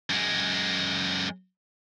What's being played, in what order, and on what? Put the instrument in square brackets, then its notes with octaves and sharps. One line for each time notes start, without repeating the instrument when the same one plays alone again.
[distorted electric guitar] F#2 G#3